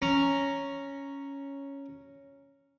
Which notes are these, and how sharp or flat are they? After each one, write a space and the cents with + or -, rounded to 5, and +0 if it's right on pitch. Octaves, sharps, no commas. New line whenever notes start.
C#4 +0 A#5 +0